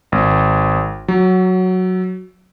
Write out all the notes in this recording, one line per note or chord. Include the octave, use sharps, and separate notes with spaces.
G#1
F#3